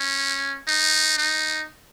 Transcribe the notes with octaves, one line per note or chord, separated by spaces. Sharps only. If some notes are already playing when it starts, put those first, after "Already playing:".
Already playing: C#4
D#4
D#4